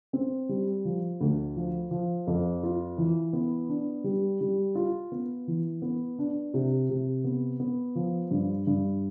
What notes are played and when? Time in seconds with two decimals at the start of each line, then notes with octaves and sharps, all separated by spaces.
0.13 C4
0.49 G3
0.85 F3
1.21 D2
1.56 F3
1.91 F3
2.27 F2
2.63 F4
2.98 E3
3.33 B3
3.69 D4
4.04 G3
4.41 G3
4.75 F4
5.12 B3
5.47 E3
5.82 B3
6.19 D4
6.54 C3
6.89 C3
7.24 B3
7.60 B3
7.95 F3
8.31 G2
8.67 G2